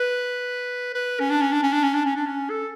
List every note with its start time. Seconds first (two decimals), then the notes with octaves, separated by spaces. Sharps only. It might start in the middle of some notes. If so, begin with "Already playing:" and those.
Already playing: B4
0.94 B4
1.20 C#4
1.30 D4
1.42 C#4
1.52 D4
1.63 C#4
1.73 D4
1.84 C#4
1.94 D4
2.05 C#4
2.16 D4
2.26 C#4
2.50 A4